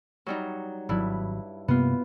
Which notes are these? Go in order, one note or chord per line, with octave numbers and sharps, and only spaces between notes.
F#3 G3 D#4
G#1 G2 F#3 E4
G2 C3 A#3 B3 F4